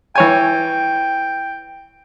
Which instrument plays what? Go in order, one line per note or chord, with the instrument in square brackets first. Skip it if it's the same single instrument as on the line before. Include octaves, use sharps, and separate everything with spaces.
[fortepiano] E3 C#5 G#5 [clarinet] G5